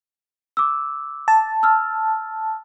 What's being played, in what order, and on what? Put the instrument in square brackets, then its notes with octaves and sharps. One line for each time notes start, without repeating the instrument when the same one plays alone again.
[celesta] D6 E6
[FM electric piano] A5
[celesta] E6 F6